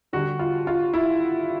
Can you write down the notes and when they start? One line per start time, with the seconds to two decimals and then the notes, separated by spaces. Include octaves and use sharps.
0.13 D3 G3 F#4
0.39 F4
0.67 F4
0.94 E4